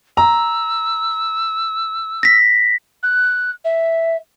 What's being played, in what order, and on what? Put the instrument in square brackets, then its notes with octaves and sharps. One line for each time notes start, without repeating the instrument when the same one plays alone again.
[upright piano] A#5 [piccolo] E6
[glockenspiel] A#6 B6
[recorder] F#6
E5